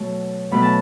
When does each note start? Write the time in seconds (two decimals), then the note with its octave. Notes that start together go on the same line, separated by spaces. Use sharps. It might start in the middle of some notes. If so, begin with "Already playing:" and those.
Already playing: B2 F#3 A3 A5
0.51 B2 F#3 A3 B5
0.62 A5